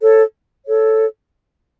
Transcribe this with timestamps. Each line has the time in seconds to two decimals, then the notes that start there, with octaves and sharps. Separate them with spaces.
0.01 A4 C#5
0.66 A4 C#5